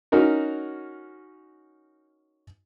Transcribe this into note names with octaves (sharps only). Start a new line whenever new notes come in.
C#4 D#4 F#4 A#4